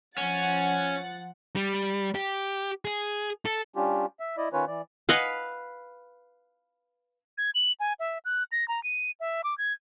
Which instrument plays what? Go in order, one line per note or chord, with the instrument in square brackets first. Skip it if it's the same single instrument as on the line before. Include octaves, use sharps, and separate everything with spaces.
[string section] F3 F#5 A6 [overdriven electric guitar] C#4
[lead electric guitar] G3
G4
G#4
A4
[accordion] G3 C#4 D4 F4 G4
E5
E4 D5 D#5
D#3 C#4 F4 B4 C#5
E3 D5
[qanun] B4 F5 [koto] D#5 F#5 G#5
[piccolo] G#6
F#7
G#5
E5
F#6
A#6
A#5
D#7
E5
D6
G#6